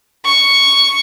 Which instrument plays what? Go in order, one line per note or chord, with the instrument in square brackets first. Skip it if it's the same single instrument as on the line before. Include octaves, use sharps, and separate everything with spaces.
[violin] C#6